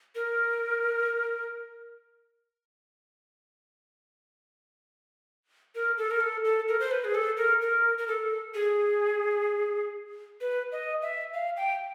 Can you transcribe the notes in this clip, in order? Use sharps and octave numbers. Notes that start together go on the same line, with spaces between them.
A#4
A#4
A4
A#4
A4
A4
A#4
C5
B4
G#4
A4
A#4
A#4
A#4
A4
G#4
B4
D#5
E5
F5
G5